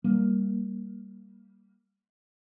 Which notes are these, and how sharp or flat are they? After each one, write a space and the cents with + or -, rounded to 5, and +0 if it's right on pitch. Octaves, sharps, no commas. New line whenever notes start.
G3 +0 A#3 +0